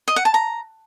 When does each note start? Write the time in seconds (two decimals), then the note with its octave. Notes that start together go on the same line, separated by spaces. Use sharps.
0.08 D#5
0.16 F#5
0.25 A5
0.34 A#5